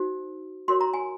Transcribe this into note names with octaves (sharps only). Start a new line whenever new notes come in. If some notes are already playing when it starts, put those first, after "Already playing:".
Already playing: D#4 F#4 C5
F#4 A#4 C#5 C6
A#5
G#5